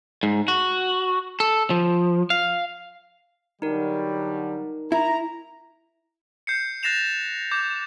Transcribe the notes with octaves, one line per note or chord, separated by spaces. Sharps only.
G#2
F#4
A4
F3
F5
D3 F#3 G3 D#4 A#4
E4 A#5
G6 C7 C#7
F#6 A6 A#6 C7 E7 F7
D6 G6